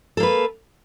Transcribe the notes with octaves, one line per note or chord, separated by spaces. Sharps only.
A#3 A4 B4